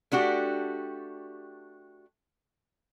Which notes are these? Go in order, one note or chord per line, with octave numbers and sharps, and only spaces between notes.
A3 D4 F#4 G4